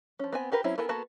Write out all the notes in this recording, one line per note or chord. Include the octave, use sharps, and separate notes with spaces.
F3 C#4
B3 C4 G#5
F#4 G4 A#4 B4
F#3 C4 C#4 E4
B3 E4 A4 A#4 G#5
A#3 B3 F#4 A4 A5